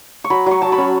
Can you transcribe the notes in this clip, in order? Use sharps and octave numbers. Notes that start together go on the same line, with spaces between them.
C#6
F#3 B5
F#3 C#6
F#3 A5
B5
C#4